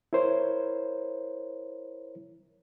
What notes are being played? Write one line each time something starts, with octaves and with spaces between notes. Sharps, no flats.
E4 A#4 C5 C#5